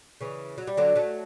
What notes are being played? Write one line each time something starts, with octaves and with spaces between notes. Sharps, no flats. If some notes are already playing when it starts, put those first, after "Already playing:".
C#3 E3
F#3
G3
D3 F#3
F#3 A3